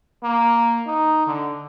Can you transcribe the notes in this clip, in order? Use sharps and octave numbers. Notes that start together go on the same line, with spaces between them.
A#3
D#4
D3